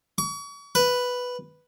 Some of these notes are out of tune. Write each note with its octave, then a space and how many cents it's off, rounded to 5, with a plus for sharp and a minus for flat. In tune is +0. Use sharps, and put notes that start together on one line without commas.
C#6 +40
B4 +0